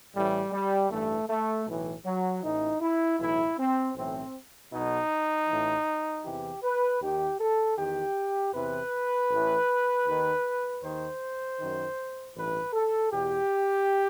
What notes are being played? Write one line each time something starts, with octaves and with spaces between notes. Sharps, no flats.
A1 A2 E3 G3
G3
A1 G2 E3 A3
A3
B1 A2 E3
F#3
A1 A2 E3 D#4
E4
B1 A2 E3 E4
C4
B1 A2 E3 C4
B1 B2 D#4
A1 A2 E3
E2 C3 E3 G4
B4
D#2 D#3 G4
A4
E2 D#3 G4
E2 C3 E3 B4
A1 A2 E3
D#2 D#3
D#2 D#3 C5
F#2 D#3
A1 G2 E3 B4
A4
E2 B2 G4